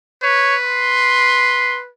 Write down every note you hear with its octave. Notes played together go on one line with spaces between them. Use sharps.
B4 C#5
C6